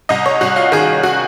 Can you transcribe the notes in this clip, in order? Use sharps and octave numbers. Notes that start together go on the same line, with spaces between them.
C2 D#5
C#5
C2 F#4
F4
D#3 G#4
F#4